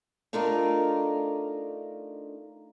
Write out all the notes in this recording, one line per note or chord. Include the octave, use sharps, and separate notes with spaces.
A3 D4 D#4 F4 A#4 D#5